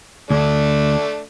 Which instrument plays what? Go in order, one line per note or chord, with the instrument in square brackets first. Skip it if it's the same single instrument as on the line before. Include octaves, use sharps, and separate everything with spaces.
[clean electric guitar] D2 [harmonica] A3 D4